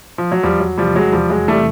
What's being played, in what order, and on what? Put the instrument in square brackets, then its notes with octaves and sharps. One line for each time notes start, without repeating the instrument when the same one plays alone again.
[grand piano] F3
F#3
[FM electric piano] E2 [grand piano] F3 G3
[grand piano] F#3
[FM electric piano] C3 E3 [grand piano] F3 G3
[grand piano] F#3 G#3
[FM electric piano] E2 [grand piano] F3 G3
[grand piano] F#3 G#3
[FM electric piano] C3 E3 [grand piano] G3 A3